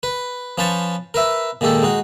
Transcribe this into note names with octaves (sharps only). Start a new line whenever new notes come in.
B4
F3 C#4 B4 C5 A5 C#6
A#4 B4 E5
A#2 D#3 G#3 G4 A4
G#3 D#4 F#4